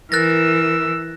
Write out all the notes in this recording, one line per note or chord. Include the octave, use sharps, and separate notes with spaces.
E3 A#4 E6 F#6 A6 A#6